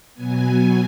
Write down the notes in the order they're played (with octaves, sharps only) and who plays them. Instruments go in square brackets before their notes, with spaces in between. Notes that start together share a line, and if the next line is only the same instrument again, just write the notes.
[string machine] B2 F#3 B3 G#5